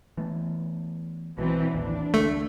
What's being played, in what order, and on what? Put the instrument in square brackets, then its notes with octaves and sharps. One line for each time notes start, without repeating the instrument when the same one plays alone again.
[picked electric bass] E3 A3 B3
[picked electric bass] B1 B2 [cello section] E3 F#3 C4
[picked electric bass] A1 D#2 [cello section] D4
[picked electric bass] D2 [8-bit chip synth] A3